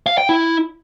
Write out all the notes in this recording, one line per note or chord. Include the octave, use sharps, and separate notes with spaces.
F5
G5
E4